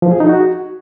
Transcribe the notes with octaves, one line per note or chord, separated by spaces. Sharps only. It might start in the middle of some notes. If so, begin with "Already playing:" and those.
F3
G#4
D#4
F#4